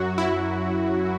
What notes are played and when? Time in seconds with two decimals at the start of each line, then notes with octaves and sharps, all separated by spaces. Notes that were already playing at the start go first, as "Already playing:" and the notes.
Already playing: F#2 F#3 F#4
0.18 E4